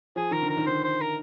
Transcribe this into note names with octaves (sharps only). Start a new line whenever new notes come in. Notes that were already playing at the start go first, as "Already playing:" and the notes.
F3 G#4
D#3 A#4
D3
A#4
D#3
D3 C5
C5
A#4